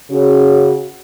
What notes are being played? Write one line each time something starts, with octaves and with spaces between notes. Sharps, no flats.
C#3 C#4 F#4